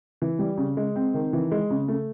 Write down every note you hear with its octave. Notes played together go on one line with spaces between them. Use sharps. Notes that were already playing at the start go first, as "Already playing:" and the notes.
E3
G3
C#3
G#3
C4
D#3
E3
G#3
C#3
A3